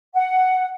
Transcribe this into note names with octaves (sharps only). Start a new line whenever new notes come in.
F#5